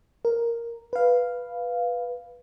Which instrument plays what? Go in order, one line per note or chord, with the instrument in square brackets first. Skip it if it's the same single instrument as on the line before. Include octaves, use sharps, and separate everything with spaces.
[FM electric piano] A#4
B4 F5